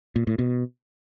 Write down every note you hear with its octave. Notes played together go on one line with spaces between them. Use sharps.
A#2
A2
B2